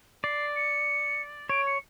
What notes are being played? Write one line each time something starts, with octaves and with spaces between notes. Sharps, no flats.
D5 C7
C#7
C#5 D7
C#7